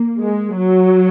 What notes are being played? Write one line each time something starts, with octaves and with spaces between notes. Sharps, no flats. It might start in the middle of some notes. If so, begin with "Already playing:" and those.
Already playing: A#3
G#3
F#3